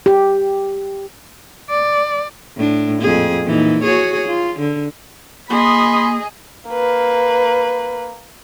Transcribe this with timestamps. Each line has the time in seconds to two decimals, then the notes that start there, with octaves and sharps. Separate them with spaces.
0.06 G4
1.70 D5
2.56 A2 D4
3.01 F2 A#2 G#4
3.43 A#2 E3 D#4
3.83 F#4 G#4 C#5
4.27 F4
4.59 D3
5.50 A#3 G#4 D#5 B5 C6
6.68 A#3 B4